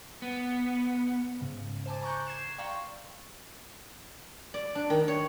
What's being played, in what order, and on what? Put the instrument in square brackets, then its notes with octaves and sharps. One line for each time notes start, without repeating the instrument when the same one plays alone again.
[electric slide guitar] B3
[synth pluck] G#2 C#3
C5 G#5 A5 D6
A#5 C#6 D6 F#6 G6
G#6 C7 E7
D5 F5 G5 A#5 C6 C#6
[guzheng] D5
D4
D#3
C#5